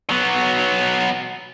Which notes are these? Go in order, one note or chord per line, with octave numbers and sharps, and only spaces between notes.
F#3 B3